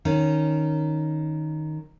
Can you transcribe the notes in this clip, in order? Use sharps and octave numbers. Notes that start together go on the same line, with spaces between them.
D#3 C#4